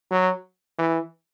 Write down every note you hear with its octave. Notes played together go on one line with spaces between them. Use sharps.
F#3
E3